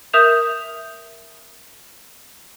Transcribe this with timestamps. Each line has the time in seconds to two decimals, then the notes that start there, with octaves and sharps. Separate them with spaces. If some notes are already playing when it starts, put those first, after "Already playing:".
0.13 A#4 E5 D#6 G6 E7 F7